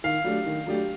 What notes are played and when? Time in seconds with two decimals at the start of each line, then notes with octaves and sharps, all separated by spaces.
0.04 D#3 F5
0.24 F#3 A3 D4 G4
0.46 D#3
0.66 F#3 A3 D4 G4